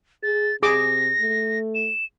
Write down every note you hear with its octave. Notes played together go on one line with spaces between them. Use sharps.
G#4 A6
C3 G#4 D6 A#6
A3
E7